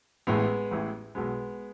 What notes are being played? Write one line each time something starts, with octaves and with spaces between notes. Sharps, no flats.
A1 A2 E3 G#3 B3
A1 A2 E3
B1 B2 G#3 B3